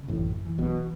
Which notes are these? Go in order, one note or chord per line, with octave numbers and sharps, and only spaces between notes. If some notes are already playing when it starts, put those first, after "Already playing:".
Already playing: C#3
A1 F#2 A2
E3
B1 B2